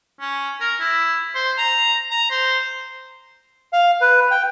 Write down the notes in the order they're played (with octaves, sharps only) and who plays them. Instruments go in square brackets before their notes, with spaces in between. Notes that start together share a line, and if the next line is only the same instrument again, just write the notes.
[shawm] C#4
A#4
E4
C5
A#5
A#5
C5
[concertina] F5
B4
G5